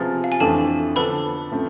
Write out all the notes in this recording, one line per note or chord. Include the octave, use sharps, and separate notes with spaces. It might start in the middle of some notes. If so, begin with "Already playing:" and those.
Already playing: C3 F3 B3 F4 G#4
F5
G#5
F2 E3 A3 D4 A4 A5
D3 F3 B3 D4 A4 B4 B5
F3 A3 C4